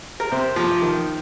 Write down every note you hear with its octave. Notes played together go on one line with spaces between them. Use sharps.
A#4
C3 C5
F3 A#3
D#3